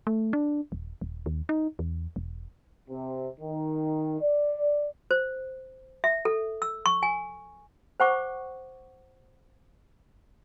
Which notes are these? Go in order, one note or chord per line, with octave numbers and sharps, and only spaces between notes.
A3
D4
D#1
D#1
D#2
D#4
E2
E1
C3
D#3
D5
C5
E5
A4
E6
C#6
G#5
C5 F#5 C#6 D6